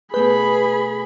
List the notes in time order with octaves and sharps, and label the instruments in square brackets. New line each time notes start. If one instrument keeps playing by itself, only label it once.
[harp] B2 A3 G6 [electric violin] G#4 B5 [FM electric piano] B4